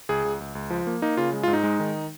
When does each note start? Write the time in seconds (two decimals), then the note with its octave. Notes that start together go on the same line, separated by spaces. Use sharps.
0.09 C#2 G#4
0.25 C#2
0.40 C#2
0.55 C#2
0.70 F3
0.87 A#3
1.02 A#3 D#4
1.17 C#3 F4
1.33 G#3
1.43 F4
1.48 G#2
1.53 D#4
1.63 G#3
1.80 D#3